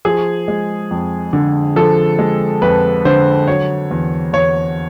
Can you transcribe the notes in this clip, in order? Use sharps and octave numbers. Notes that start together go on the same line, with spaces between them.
F3 G#4
G#3
F2
D3
F3 A4
G#3
F2 B4
D3 C5
F#3 C#5
E2
E2 C#5